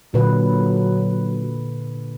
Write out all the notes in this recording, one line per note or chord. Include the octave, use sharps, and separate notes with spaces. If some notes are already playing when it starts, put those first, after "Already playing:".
A#2 D3 F#3 B4